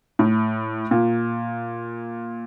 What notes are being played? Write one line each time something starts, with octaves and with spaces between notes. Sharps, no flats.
A2
A#2